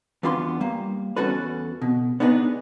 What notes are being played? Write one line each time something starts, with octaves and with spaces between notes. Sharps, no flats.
E2 B3 D4 F4 B5 C6
G3 A#3
E2 C#3 C#4 F#4 A4 B4
B2
B3 D4 D#4 G#4 A4 B4